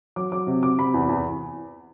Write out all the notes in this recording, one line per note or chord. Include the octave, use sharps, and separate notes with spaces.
F#3 D6
F#3 D6
C3
C3 D6
C3 B5
E2
E2